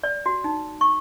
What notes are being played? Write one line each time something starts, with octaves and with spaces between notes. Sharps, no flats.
D5
F#4
D#4
C#6